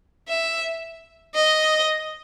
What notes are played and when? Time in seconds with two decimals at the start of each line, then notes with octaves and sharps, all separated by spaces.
0.29 E5
1.35 D#5